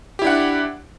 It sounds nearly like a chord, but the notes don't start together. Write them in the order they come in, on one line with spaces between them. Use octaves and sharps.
G4 E4 D4 F#5